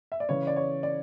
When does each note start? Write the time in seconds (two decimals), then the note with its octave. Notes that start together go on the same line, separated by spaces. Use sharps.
0.12 E5
0.20 D5
0.29 C#3 E3 C#5
0.47 D5
0.56 C#5
0.83 D5